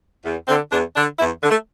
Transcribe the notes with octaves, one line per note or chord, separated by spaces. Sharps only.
E2
D3 C4
E2 D4
D3 D4
E2 E4
D3
A3